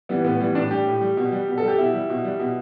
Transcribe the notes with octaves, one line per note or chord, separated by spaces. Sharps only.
E3 G3 B3
A2 B3
E3 G3
A2 D4
G3 G4
A2
G3
B2
G3
B2
A4
G3
G4
B2 E4
G3
B2
G3
B2